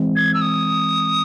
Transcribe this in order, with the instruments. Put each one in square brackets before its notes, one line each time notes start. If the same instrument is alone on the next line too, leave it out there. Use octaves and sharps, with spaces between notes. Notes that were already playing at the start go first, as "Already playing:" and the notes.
Already playing: [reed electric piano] E3 G#3 C4
[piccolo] G#6
E6
D#6